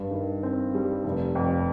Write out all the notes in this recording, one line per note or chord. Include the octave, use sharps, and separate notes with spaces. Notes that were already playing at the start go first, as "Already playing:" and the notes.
Already playing: G2
D#3
C4
G3
F1
F2